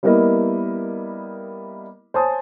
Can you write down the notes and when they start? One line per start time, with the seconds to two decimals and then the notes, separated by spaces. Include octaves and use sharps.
0.03 G3 A#3 B3 E4 A#4 D#5
2.14 C5 C#5 G#5 A5 D#6